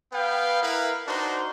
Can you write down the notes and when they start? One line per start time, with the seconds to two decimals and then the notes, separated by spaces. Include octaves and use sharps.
0.12 B3 B4 F5 G5
0.62 E4 A#4 B4 F5
1.07 D4 D#4 F#4 A#4 C5